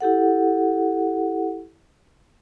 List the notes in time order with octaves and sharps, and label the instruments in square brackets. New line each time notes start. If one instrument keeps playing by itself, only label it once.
[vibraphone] E4 G4 A4 F#5